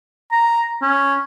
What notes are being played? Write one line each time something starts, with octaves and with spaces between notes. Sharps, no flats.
A#5
C#4